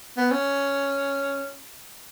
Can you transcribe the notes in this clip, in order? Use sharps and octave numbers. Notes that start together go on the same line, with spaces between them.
B3
C#4